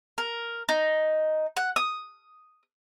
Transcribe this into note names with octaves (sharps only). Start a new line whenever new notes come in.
A#4
D#4
F#5
D#6